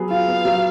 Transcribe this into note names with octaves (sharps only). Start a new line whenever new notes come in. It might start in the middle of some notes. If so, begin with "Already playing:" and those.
Already playing: F#3 B3 G#4
F4 F5
B3
F#3